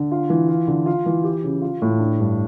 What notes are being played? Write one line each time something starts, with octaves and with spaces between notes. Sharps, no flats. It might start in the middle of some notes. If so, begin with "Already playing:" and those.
Already playing: D3
F4
E3
F4
D3
F4
E3
G4
C#3
F4
A2
D4
G2